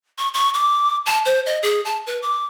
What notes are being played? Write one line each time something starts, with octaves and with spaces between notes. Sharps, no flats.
C#6
C#6
D6
A5
C5
D#5
G#4
A5
B4
D6